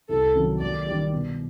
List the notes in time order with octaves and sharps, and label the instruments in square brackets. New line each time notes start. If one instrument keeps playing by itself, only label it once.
[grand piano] C2 [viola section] A4
[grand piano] C3 D#3 F#3
[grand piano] D#2 [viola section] D5
[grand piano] D#3 G3
B2